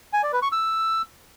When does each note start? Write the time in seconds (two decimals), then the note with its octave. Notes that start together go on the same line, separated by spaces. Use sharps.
0.13 G#5
0.23 D5
0.33 B4
0.42 C#6
0.52 E6